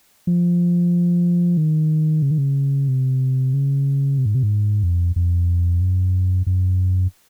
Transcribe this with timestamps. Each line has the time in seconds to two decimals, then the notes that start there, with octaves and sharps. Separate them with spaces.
0.27 F3
1.57 D#3
2.22 C#3
2.31 D#3
2.38 C#3
2.88 C3
3.54 C#3
4.18 C3
4.26 G#2
4.35 C3
4.43 G#2
4.83 F2
5.16 F2
5.81 F#2
6.47 F#2